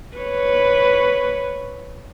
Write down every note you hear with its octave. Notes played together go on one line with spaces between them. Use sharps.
B4 C#5